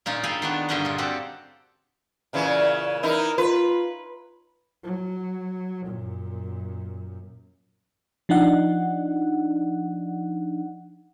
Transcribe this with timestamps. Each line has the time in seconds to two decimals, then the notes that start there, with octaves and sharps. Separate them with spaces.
0.06 A#2 C#4 D#4 F4
0.23 G#4 A4 F5 G5 G#5 B5
0.42 D#3 B3 D4
0.69 G2 D3 C#4 A#4 C5 D#5
0.85 A#2 F4
0.98 C4 F#4 G4 A4
2.33 A#2 C#3 E3
3.03 E3 D#4 E4 A#4
3.38 F4 B4
4.84 F#3
5.86 F#2 A#2
8.29 F3 D4 D#4 F#5